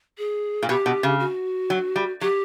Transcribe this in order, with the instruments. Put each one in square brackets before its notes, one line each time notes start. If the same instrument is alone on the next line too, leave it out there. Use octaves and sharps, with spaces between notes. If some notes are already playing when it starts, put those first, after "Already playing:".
[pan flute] G#4
[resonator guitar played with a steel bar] A#2
[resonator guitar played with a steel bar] B2 [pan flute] G4
[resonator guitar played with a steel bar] B2
C#3
[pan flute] F#4
[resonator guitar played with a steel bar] F#3
G3
[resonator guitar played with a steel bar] F#3 [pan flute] G4